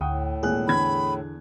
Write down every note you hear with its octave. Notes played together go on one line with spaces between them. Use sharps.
D2 A2 F#5 G5 D#6
G#1 A#2 G#4 F#6
E2 D3 B5 G#6